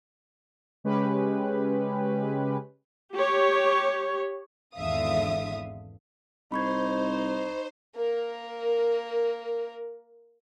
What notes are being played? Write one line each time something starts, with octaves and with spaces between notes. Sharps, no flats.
C#3 G#3 C#4 G4 B4
G4 C#5
G#1 E2 D3 E5 F5 D#6
C2 D#4 C5 B5 C#6 G#6
A#3 A#4